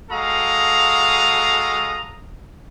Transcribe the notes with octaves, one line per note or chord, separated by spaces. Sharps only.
G#3 F#4 A4 F5 A#5 D#6